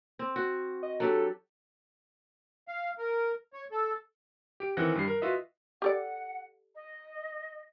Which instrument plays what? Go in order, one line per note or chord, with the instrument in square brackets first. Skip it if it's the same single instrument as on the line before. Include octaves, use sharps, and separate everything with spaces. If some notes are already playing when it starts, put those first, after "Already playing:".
[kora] C4
F#4
[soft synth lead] D#5
[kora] F#3 D4 G4 [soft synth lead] A4
[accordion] F5
A#4
C#5
A4
[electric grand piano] G4 D7
D#3 E3 C4 F#5 F#6 A#6
G2 G3 C7
A#4
F4 F#4 B4 D#5 E5
[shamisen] G4 A4 D5 [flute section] F#5
[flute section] D#5